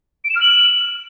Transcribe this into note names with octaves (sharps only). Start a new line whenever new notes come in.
D7
E7
F6
F#7